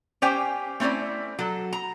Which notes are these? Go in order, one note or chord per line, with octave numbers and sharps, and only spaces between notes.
C#4 G4 C5 D5 G5 G#5
A3 C4 C#4 E4 D5
F#3 A4
A#5